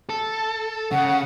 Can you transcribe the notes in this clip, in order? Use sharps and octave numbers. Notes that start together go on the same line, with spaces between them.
A4
C#3 F#5